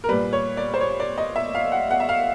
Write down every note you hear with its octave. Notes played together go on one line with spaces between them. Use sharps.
A#4
A#2 G3 B4
C#5
D5
C5
C#5
D5
D#5
E5
F5
F#5
F#5
E5
F5